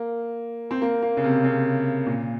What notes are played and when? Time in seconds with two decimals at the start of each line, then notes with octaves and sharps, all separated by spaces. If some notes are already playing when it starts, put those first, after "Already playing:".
Already playing: A#3
0.71 C4
0.82 A#3
1.02 A#3
1.17 C#3
1.24 C3
1.44 C#3
2.06 A#2